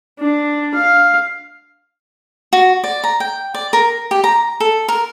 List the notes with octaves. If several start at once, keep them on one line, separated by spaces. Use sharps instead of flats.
D4
F5
F#4
D5
A#5
G5
D5
A#4
G4
A#5
A4
A#4